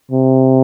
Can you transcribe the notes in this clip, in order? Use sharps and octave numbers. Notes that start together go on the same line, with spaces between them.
C3